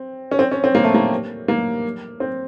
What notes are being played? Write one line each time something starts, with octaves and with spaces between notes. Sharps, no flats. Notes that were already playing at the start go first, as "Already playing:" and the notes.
Already playing: C4
C#4
C4
C#4
C4
A#3
A3
A#3
A#3
C4